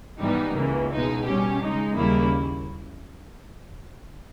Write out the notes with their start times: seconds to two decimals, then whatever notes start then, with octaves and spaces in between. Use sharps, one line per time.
0.20 G#2 E3 G3 B3 D#4
0.55 C#2 C#3 E3 A#3
0.91 B2 G#3 D#4
1.25 B2 G3 C#4 G4
1.61 C#3 G#3 D#4
1.96 D#2 C#3 G3 A#3 E4